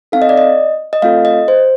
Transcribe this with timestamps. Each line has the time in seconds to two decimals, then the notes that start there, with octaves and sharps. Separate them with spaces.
0.12 C4 D#4 A4 F5
0.22 D#5
0.29 D5
0.37 D#5
0.93 D#5
1.02 A3 C4 F4 A4 F5
1.25 D#5
1.48 C5